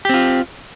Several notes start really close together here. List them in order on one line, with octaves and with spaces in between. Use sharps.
G4 C4 F4